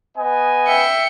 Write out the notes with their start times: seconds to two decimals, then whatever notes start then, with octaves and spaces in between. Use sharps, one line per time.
0.18 B3 D#5 G#5
0.68 E5 G5 C#7